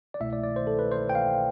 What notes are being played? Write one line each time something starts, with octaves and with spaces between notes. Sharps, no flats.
D5
C2 B2 A3 E4 E5
D5
D5
C5
A4
B4
C5
G5
F5